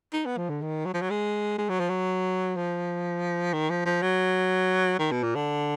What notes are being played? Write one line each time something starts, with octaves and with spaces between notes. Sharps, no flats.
D#4
B3
F3
D3
D#3
F#3
F3
F#3
G#3
G#3
F#3
F3
F#3
F3
D#3
F3
F3
F#3
D#3
B2
A#2
D3